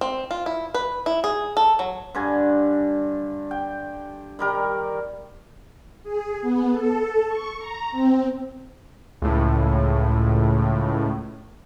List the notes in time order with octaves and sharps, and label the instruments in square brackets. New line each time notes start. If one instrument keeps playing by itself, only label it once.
[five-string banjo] C4
F4
E4
B4
E4
G#4
A4
F#3
[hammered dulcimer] G2 D3 G#5
G5
D#3 G3 A#4
[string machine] G#4
B3
A4
C#6
A#5
C4
[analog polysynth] C#2 A2